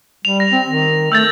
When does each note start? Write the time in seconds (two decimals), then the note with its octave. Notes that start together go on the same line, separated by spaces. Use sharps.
0.25 G3 F7
0.40 A#6
0.52 C4
0.67 D#3
1.12 A3 E6 G6 A6